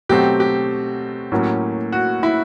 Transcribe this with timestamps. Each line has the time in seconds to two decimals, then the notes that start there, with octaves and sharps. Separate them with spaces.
0.09 B2 F#3 A3 C4 G4
0.40 G4
1.32 A2 F#3 A#3 C#4
1.92 F#4
2.23 E4